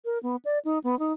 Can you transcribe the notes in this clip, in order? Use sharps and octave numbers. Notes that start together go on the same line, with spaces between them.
A#4
B3
D5
D#4
B3
D#4